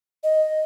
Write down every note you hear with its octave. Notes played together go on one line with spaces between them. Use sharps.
D#5